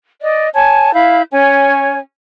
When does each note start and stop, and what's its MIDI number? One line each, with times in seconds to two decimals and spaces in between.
0.22 0.48 74
0.22 0.48 75
0.54 0.93 73
0.54 0.93 80
0.54 0.93 81
0.94 1.21 64
0.94 1.21 77
0.94 1.21 83
0.94 1.21 91
1.31 1.99 61
1.31 1.99 73
1.31 1.99 80